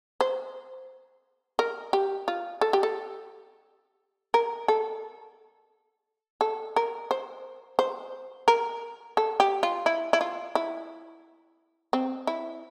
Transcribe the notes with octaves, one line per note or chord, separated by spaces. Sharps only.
C5
A#4
G4
F4
A4
G4
A4
A#4
A4
A4
A#4
C5
C5
A#4
A4
G4
F4
E4
E4
F4
E4
C4
E4